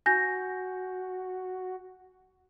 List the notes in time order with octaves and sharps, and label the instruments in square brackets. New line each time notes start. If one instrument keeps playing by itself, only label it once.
[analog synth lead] F#4 [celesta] G#5 G6 A#6